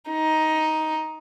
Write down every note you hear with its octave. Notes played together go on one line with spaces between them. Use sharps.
D#4